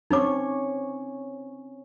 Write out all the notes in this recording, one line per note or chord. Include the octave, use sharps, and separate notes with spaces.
C4 C#4 D#4 C#5 D6